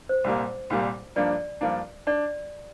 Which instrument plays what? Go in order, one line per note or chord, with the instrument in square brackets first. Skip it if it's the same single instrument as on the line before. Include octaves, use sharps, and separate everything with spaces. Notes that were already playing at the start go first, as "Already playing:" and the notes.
[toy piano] C5
[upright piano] C2 A#2 G3 A#3
C2 A#2 G3 A#3
[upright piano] G2 F3 A#3 D4 [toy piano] D5
[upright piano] G2 F3 A#3 D4
[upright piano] D4 [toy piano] D5